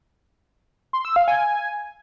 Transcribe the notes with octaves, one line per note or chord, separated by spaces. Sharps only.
C6
E6
F5
G#5